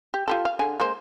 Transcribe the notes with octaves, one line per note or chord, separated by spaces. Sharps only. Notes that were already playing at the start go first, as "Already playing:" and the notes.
G4
F4 G4 A4
F5
D3 G#4 G#5
G#3 A#3 C5